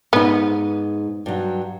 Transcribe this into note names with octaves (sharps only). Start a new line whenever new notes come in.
G#2 B3 D#4
G2 F#3